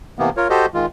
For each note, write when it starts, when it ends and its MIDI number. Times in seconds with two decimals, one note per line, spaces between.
0.19 0.30 48
0.19 0.30 52
0.19 0.30 58
0.19 0.30 59
0.37 0.48 65
0.37 0.48 70
0.37 0.48 73
0.50 0.66 66
0.50 0.66 67
0.50 0.66 69
0.50 0.66 72
0.50 0.66 75
0.74 0.86 51
0.74 0.86 56
0.74 0.86 65